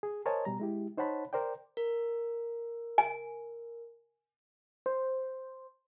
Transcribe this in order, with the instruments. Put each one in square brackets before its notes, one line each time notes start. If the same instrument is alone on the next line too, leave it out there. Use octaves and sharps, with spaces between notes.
[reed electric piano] G#4
A#4 C5 C#5 D#5 G#5 A5
B2 G3 A#5
G#3 E4 G4
D#4 C5 C#5 F#5 A5 B5
A#4 C5 D5 G5
[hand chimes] A#4
[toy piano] G#5
[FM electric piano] C5